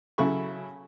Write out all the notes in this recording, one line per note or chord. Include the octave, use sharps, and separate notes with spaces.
C#3 F#3 E4 A4 B5 C#6